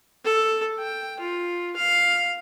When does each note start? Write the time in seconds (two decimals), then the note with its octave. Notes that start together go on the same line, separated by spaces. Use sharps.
0.25 A4
0.79 G5
1.20 F4
1.77 F5